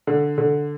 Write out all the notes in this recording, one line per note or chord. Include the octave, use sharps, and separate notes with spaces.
D3
D3